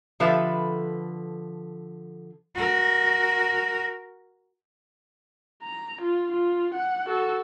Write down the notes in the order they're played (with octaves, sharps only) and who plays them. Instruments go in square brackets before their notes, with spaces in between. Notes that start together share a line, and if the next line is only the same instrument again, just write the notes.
[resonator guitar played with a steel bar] D3 F3 A4 B4 E5
[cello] F#4 A#4
[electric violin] A#5
F4
F4
F#5
F#4 A4